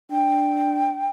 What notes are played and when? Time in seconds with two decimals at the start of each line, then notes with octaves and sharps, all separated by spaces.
0.11 D4 G5